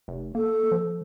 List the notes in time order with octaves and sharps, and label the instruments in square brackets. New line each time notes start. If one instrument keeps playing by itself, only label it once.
[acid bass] F1
[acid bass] A#3 [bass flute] A4
[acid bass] F3